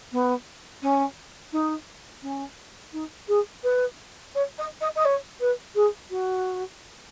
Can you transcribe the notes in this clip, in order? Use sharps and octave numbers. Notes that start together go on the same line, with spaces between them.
B3
C#4
D#4
C#4
D#4
G#4
B4
C#5
D#5
D#5
D#5
C#5
B4
G#4
F#4